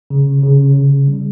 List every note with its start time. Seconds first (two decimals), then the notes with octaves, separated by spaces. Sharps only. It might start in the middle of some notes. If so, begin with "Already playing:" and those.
0.10 C#3
0.43 C#3
0.75 C#3
1.08 G3